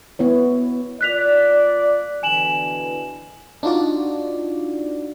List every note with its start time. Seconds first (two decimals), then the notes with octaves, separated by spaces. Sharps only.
0.19 B3 E4 C#5
1.01 A#3 F4 D5 F#6 B6 F7
2.23 B2 D3 E3 G#5 E7 F#7
3.63 D4 D#4 F4 F#4 D5